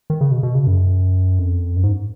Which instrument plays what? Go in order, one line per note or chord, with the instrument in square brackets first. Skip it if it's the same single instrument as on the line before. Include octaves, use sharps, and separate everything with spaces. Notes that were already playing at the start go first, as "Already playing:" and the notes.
[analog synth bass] D#3
C#3
B2
B2
C#3
F#2
F2
F#2
G#2